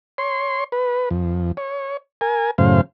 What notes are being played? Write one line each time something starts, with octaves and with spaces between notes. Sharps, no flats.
C#5 C6
B4
F2
C#5
A#4 G#5
F#2 A2 C#3 C5 F5